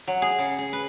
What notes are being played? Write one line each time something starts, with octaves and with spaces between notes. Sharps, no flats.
F#3
G#4
C#3
G#4
B4